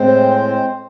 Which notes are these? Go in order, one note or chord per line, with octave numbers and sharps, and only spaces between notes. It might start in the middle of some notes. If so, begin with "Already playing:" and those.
Already playing: A2 G#3 C4 C5